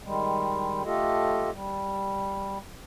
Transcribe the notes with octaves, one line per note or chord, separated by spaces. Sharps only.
D#3 G3 G#3
A3 F4 G4 A4 D#5
G3